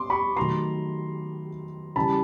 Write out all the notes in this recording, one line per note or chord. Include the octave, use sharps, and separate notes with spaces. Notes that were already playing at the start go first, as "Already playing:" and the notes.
Already playing: B3 C6 D6
B5 C#6
D#3 F#3 A3 A#5 C6
C#3 E3 G3 A5 B5